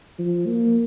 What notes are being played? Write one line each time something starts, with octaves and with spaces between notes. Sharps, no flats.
F3
A#3